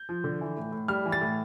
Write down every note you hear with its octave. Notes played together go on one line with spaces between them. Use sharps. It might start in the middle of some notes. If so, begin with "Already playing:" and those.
Already playing: G6
F3
D3
E3
A2
A2
G3 F6
E3
A6
A2